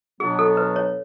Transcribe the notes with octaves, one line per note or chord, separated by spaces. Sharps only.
B2 F#3 B3 D4 G#4
A4
B4
C#5